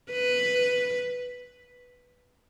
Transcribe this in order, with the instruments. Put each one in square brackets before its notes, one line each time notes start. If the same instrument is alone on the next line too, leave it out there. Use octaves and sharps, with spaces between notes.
[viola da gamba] B4